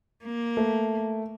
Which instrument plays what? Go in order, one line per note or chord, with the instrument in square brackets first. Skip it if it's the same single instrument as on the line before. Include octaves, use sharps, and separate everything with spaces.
[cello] A#3
[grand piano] A3